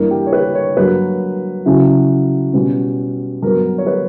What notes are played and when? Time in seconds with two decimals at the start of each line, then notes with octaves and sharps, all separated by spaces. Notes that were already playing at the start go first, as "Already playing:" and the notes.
Already playing: G2 E3 A#3 D4 A#4
0.11 G4
0.27 C#5
0.33 B4
0.55 C#5
0.77 G2 F#3 A#3 B4
1.66 C#3 F#3 C#4 E4
2.53 B2 G3 C#4
3.42 G2 F#3 B3 A#4
3.78 C#5
3.87 B4